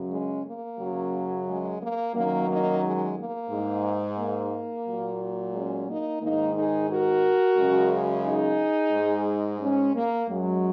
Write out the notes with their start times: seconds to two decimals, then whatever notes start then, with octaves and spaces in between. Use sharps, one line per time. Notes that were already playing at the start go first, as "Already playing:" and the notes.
Already playing: F#2 C#3 F#3
0.10 G#3 C#4
0.44 A#3
0.78 F#2 C#3 F#3
1.46 G#3
1.80 A#3
2.14 F#2 D#3 F#3 A#3
2.48 A#3 D#4
2.82 G#3
3.16 A#3
3.50 G#2 G#3
4.18 A#3
4.86 A#2 F#3
5.53 G#3 C#4
5.87 A#3 D#4
6.21 G#2 D#3 G#3 A#3 D#4
6.55 D#4 G#4
6.89 F#4 A#4
7.57 F#2 C#3 G#3
8.24 D#4 G#4
8.93 G#2 G#3
9.61 G#3 C#4
9.94 A#3
10.28 F#2 F#3 G#3